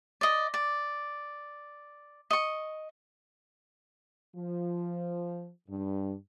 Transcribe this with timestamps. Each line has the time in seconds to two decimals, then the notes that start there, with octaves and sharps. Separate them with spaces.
0.21 D5 D#5
0.54 D5
2.31 D#5 C#6
4.35 F3
5.68 G2